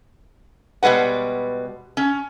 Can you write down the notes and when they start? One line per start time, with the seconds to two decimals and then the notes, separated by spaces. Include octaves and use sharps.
0.83 B2 G3 G#3 B4 F#5
1.97 C#4